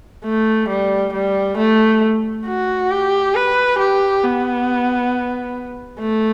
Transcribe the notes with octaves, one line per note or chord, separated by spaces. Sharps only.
A3
G3
G3
A3
F#4
G4
B4
G4
B3
A3